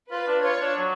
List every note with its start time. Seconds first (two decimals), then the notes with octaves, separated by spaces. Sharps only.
0.11 F4 B4
0.27 D4
0.44 F4 C#5
0.61 D4
0.77 F#3